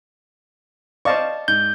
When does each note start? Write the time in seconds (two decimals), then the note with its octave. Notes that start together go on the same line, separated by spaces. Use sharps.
1.05 C5 D5 D#5 F5 A5 C#6
1.48 G#2 G6